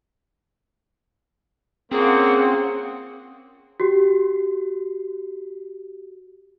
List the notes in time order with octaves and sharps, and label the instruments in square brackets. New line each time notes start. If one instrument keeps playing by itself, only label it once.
[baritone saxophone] A#3 [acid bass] C4 [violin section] C#4 F4 F#5 [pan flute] G#4
[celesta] F#4 G4